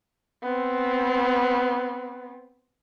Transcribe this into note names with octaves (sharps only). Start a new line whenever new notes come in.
B3 C4